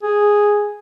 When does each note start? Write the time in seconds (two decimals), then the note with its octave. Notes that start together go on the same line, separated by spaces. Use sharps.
0.03 G#4